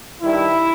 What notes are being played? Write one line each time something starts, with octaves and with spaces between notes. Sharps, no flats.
G2 D#3 G3 E4